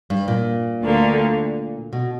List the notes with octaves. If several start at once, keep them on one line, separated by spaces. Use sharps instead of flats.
G2
A#2
D2 D3 A#3
B2